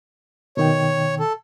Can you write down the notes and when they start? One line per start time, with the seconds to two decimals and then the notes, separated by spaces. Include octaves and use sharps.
0.57 B2 D#3 C#5 G5
1.19 A4